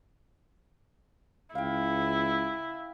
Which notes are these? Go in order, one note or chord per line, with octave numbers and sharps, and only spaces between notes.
C#2 E4 F5 G5